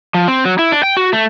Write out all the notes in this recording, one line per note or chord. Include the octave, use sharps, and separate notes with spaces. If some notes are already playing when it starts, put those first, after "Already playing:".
F3
C4
F#3
E4
D4
G5
F#4
A3